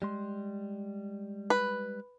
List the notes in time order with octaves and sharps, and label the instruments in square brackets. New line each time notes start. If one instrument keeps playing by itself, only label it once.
[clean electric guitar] G3 G#3 C6
[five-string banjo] B4